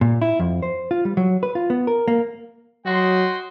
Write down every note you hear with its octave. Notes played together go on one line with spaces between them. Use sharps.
A#2
E4
F2
C5
F4
G3
F#3
B4
F4
B3
A#4
A#3
F#3 F#4 D#5 G5 C6